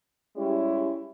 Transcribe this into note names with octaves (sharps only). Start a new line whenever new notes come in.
G3 G#3 C#4 E4 G4